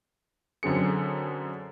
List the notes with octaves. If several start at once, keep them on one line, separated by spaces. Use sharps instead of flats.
F#2 D3 C4 G#4 C#7